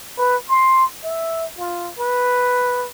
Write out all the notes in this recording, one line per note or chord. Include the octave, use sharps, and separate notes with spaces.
B4
C6
E5
F4
B4